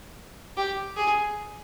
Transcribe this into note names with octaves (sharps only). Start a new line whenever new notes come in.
G4
G#4